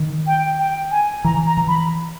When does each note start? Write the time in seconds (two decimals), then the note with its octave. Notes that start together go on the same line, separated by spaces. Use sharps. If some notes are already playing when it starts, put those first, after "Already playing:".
Already playing: D#3
0.27 G5
0.59 G5
0.91 G#5
1.24 E3 A#5
1.47 A#5
1.57 E3
1.68 B5